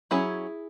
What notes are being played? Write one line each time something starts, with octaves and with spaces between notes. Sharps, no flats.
F#3 C#4 E4 G#4